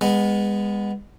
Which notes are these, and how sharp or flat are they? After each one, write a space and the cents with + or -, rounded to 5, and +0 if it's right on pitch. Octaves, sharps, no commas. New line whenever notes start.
G#3 -30 B3 +0